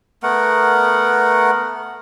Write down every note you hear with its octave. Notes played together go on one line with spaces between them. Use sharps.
A3 B3 A#4 F#5